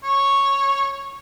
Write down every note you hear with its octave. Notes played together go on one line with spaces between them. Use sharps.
C#5